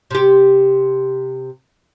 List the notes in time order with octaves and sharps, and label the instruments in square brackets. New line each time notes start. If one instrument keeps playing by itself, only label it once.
[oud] C3 G4